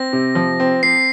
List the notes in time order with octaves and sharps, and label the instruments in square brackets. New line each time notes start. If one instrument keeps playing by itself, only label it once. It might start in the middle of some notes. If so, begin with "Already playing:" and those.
Already playing: [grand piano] C4 [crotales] A#6
[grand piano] C3
F3
C4
[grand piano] C4 [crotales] C7